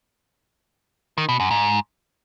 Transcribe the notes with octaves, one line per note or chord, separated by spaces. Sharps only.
D#3
B2
F#2
G#2